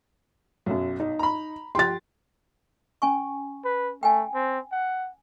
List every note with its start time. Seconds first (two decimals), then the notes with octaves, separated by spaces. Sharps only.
0.66 B1 F#2 F#3
1.00 D#4
1.19 A#5 B5
1.75 F3 G4 C6 A6
3.02 C#4 G#5 C#6
3.65 B4
4.03 A3 G5 G#5
4.34 C4
4.72 F#5